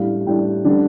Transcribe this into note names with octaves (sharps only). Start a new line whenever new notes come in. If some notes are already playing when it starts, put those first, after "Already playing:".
Already playing: A2 G3 D4 F5
A2 G3 D4 G5
D3 G3 D4